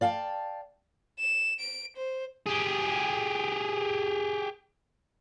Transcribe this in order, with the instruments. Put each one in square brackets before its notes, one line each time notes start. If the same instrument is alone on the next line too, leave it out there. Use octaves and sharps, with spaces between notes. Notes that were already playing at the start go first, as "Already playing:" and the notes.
[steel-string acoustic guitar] D5 F5 G5 A5
[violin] E7
D7
C5
[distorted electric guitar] G4 G#4